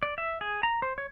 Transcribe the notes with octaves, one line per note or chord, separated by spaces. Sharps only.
D5
E5
G#4
A#5
C5
C#5